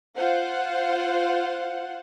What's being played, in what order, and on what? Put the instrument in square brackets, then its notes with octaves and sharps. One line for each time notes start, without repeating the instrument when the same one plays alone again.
[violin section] F4 C5 F#5